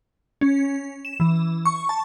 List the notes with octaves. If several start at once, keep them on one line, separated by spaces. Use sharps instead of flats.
C#4
E7
E3
C#6
A5